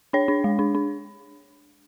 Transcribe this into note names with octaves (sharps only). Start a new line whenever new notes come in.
D4 C#5
D4
G#3
D4
D4